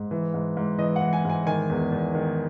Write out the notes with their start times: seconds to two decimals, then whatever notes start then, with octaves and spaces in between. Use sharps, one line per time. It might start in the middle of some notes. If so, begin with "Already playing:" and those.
Already playing: G#2
0.11 E3
0.34 G#2
0.57 G#2
0.78 E3 D#5
0.96 F#5
1.01 E3
1.13 G#5
1.25 G#2 G#5
1.47 D#3 G#5
1.70 E2
1.92 E2
2.14 D#3